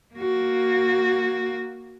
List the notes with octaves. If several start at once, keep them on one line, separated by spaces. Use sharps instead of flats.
A#3 F#4